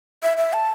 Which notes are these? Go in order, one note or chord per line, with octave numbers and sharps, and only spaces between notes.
E5
E5
A5